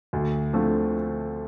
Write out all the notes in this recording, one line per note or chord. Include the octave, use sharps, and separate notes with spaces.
D2
D3 F3 A3 C4